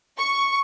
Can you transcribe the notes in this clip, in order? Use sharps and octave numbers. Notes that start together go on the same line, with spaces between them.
C#6